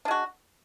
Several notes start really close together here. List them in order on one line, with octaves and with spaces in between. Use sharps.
D4 G#3 F#4